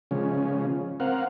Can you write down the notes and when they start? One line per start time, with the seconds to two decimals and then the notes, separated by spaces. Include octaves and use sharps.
0.11 C#3 F3 G#3 C#4
1.00 C4 A#4 F5 F#5